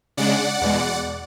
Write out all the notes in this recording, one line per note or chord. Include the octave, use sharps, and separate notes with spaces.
C#3 G#3 D4 D5 F#5
E2 B2 G#3